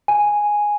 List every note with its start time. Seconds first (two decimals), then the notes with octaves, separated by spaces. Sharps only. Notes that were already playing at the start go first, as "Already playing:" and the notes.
0.08 G#5